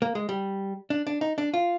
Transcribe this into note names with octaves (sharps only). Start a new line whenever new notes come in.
A#3
G#3
G3
D4
D4
D#4
D4
F4